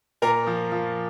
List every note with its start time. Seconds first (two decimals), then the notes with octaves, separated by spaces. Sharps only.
0.22 A#2 A#4 A#5
0.47 F3
0.72 F3